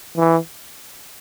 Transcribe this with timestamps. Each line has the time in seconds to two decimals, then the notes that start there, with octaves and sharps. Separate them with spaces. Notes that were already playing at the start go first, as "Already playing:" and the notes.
0.17 E3